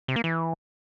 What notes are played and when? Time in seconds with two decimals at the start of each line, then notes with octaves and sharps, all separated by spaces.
0.08 C3
0.16 A#3
0.24 E3